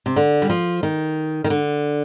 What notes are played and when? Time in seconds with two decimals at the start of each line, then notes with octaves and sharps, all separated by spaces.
0.06 C3
0.16 D3
0.42 G3
0.49 F3
0.83 D#3
1.44 D#3
1.50 D3